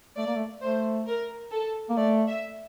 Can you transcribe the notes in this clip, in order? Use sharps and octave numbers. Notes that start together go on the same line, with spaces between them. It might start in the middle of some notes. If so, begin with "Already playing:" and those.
A3 D5
A#3
A3
A3 C5
A#4
A4
A#3
A3 D5
E5